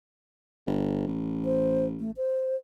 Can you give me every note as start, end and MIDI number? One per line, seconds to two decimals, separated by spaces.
0.67 1.07 31
1.07 2.14 33
1.45 1.86 72
1.99 2.11 57
2.17 2.56 72